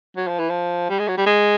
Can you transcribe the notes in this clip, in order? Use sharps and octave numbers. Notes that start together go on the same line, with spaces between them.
F#3
F3
E3
F3
G3
G#3
F#3
G3
G#3